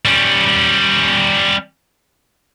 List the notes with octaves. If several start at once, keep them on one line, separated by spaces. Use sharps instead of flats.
G3 C#4